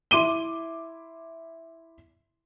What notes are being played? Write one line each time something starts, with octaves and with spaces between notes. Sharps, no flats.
E4 C6 D6 D#7 G7